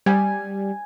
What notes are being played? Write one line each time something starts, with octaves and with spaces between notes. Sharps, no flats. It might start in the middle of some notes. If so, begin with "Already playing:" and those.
G3 G#5